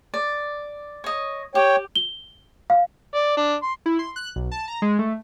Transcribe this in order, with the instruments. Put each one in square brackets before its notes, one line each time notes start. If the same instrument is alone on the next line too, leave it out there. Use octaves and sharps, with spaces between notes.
[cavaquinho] D5
C#5 D#5
[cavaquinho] G4 [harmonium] C#5 G5
[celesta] G7
F5
[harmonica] D5
D4
C6
[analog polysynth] E4
C6
F#6
B1
A5
A#5
G#3
A3